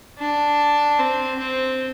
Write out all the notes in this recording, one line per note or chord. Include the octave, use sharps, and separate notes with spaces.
D4
C4
C4